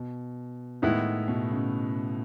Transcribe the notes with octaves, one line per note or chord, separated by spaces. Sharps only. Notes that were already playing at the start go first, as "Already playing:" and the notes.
Already playing: B2
A2 D#3 G#3 B3 E4
B2
C#3